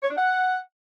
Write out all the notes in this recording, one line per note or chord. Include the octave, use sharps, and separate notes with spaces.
C#5
D4
F#5